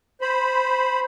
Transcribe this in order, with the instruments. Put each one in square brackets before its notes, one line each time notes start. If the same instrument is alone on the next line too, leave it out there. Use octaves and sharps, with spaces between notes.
[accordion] C5 B5